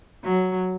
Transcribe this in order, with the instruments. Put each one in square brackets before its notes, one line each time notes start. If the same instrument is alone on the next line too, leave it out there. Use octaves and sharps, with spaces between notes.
[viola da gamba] F#3